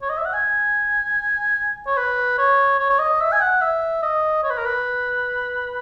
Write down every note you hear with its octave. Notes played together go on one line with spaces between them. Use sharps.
C#5
D#5
E5
F#5
G#5
C#5
B4
C#5
C#5
C#5
D#5
E5
G#5
F#5
E5
D#5
C#5
B4
A#4
B4